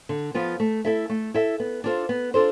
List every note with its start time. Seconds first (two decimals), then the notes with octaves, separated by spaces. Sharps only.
0.09 D3
0.34 F3 B3 F4 B4
0.60 A3
0.85 E4 A4 E5
1.09 A3
1.34 E4 A4 E5
1.60 B3
1.84 D4 F4 A4 C5
2.09 B3
2.34 D4 F4 A4 C5